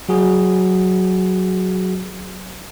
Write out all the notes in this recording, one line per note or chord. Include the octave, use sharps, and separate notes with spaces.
F#3 F#4 G#4